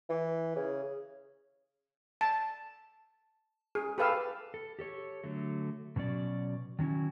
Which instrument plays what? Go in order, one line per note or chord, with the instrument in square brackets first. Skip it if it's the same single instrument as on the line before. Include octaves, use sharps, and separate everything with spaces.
[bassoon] E3
C#3
[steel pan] A5
G#4
G4 A4 B4 F5 E6
[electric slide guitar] A4
G4 A4 C#5
D3 F#3 A3
B2 F#3 C#4 D5
D#3 F#3 C#4 E4